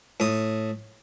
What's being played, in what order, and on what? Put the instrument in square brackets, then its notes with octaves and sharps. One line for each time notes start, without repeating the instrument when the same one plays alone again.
[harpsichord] A2 D#6